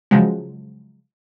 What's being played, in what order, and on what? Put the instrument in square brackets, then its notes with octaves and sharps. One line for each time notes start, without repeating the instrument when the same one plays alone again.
[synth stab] C#3 F3 F#3 G#3